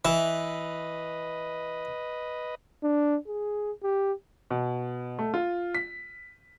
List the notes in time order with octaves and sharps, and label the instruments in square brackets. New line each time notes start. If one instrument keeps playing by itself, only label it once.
[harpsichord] E3 [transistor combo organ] B4 D#5 [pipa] E5
[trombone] D4
G#4
G4
[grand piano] B2
A3
F4
B6